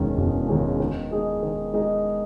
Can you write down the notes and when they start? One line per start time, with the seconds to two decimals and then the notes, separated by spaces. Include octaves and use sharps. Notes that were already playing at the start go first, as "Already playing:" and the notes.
Already playing: E1 D#2 D#3 G#3 C#4
0.17 E1
0.48 D#2 D#3 G#3 C#4
0.80 D#3
1.11 G#3 D#4 G#4 D#5
1.43 D#3
1.74 G#3 D#4 G#4 D#5